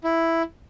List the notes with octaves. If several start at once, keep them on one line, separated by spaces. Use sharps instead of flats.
E4